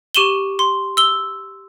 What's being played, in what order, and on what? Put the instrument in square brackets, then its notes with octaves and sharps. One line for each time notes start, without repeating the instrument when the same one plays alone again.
[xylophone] G4 C#6 D#7 E7 F#7 G7
C6
E6 G7